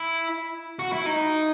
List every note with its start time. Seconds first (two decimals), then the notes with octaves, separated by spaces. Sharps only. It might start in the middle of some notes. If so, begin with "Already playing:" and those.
Already playing: E4
0.79 F#4
0.93 E4
1.06 D#4